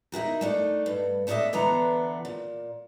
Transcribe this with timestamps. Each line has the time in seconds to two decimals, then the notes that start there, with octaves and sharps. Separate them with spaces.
0.12 D#4 E4 F#4 A#4
0.41 A3 D4 D#4
0.86 G2
1.27 A3 B3 D4 A#4 D#5 E5
1.53 D3 E3 B3 D4 A#5
2.25 A#2